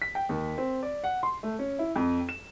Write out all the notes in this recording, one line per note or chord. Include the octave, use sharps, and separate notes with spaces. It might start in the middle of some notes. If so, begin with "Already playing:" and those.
B6
G5
D#2
C4
D5
F#5
C6
A3
C#4
E4
F2
E7